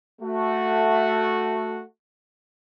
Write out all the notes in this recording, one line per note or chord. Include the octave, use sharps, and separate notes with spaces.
A3 F#4